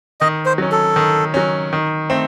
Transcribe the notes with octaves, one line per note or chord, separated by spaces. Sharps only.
D#3 D#5
C5
F#3 C#4
A4
D#3
F#3 C#4
D#3
A3 C4